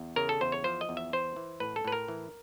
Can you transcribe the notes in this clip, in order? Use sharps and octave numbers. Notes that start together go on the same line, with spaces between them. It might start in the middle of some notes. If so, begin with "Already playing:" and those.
Already playing: E2
C#3 A#4
A4
E2 C5
C#5
F3 C5
D#5
E2
E5
E3 C5
E3
A2 B4
A4
A2 B4
A#4
E3